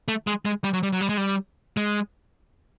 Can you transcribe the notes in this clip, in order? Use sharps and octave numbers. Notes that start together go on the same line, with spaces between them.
A3
G#3
G#3
G3
F#3
G3
F#3
G3
G#3
G3
G#3